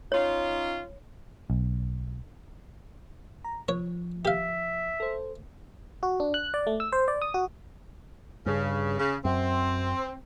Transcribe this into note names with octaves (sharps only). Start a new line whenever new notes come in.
C#4 D#4 F4 C#5
B1
A#5
F3 C#5
G4 E5 F5
A4 C5
F#4
D4
F#6
D5
A3
E6
C5
D5
D#6
F#4
G2 C#3
C#3
F#2 C4